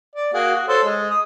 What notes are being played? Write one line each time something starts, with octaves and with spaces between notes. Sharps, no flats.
D5
A#3 F#4 G#4
F#4
A4 C5 C#5
G#3
D#6